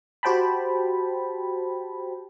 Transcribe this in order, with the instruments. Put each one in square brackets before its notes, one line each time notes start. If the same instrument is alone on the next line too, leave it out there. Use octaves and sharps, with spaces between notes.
[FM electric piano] F#4 G4 C5 G5 A5 B5